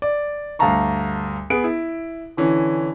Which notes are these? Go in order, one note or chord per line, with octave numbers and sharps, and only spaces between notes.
D5
D2 G2 F5 A5 A#5 C#6
B3 G#4 D7
E4
D3 E3 C#4